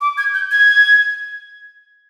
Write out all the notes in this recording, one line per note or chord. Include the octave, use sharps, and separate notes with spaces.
D6
G#6
G6
G#6